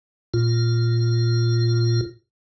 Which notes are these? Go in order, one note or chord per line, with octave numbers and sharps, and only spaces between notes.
A#2 F4